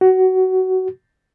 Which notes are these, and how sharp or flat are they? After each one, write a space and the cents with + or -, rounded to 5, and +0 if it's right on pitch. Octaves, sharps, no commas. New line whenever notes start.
F#4 +20